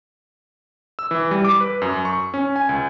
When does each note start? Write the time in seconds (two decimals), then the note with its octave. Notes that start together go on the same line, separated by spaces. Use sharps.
0.99 E6
1.11 E3
1.31 G3
1.44 D6
1.61 B4
1.82 F#2
2.05 C#6
2.34 C#4
2.56 G#5
2.69 C#2